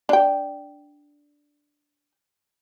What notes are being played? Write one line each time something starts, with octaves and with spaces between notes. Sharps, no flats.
D4 G5